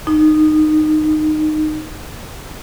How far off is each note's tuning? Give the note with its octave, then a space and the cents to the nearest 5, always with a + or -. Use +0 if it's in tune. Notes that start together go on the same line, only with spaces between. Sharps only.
D#4 -15